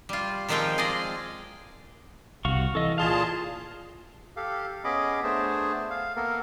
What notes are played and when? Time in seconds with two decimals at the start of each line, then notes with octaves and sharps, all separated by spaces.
0.09 G3 F4
0.49 D#3 F3 G#3 C4 F4 G5
0.78 G#4 D5 D#5
2.45 C2 C3 F#4 F5 C#6
2.75 E3 A4 D#5
2.98 A#2 G#4 F5 A5 C6
4.36 G4 A4 F5
4.84 B3 C#4 G#4 D#5 B5 D6
5.24 A3 B3 D4 G#4 C5 A5
5.90 F5
6.16 A#3 B3 A4 A#4